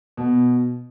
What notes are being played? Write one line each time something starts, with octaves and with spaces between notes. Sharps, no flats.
B2